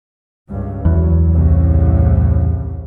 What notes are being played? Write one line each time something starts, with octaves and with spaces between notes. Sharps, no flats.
C#2 G2
E2 F#3
C2 A2 C#3